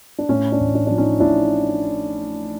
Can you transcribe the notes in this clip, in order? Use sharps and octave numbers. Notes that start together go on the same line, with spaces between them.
D4
A2 C#4
D4
A1
D4
F3 D4
C#4 D#4
A1 D4 E4